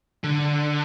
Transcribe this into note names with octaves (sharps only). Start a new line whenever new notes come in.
D3